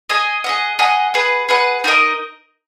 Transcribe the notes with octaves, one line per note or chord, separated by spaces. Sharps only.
G#4 D#5 G#5
G#4 D#5 F#5
G#4 D#5 F#5
G#4 B4 F#5
G#4 B4 F#5
D#4 F#4 A#4 D#5